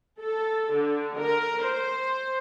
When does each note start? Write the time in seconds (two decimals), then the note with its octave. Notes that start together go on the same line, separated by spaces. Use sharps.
0.22 A4
0.73 D3
1.20 A#4
1.65 C5